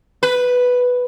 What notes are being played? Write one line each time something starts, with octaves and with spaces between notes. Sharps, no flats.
B4